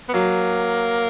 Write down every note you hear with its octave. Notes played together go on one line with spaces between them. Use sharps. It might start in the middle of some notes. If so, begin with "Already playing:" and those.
B3
F#3 A#3